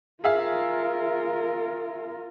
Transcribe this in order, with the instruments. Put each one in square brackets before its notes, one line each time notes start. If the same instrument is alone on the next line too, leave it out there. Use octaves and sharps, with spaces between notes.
[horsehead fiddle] F4 A#4 [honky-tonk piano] G#4 E5 F5